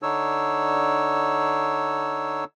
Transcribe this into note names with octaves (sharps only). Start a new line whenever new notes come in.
D3 D4 D#4 C#5 E6